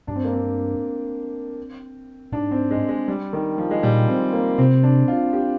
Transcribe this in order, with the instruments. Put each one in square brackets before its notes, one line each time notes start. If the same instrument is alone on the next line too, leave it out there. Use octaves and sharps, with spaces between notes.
[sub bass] G2 [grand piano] D4
[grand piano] C4
A#3
C4
[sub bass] G#2 [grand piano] D4
[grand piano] C4
G#3
G#3
G3
D#3
F3
G#3
[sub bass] A#2 [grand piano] G3
[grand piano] C4
A#3
[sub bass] C3 [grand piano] C4
[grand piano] D4
F4
G4